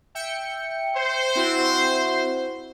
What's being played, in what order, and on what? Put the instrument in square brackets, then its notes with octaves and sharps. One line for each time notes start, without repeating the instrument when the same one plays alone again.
[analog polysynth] E5 G5 C#7
[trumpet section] C5
[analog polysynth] C4 E4 F#4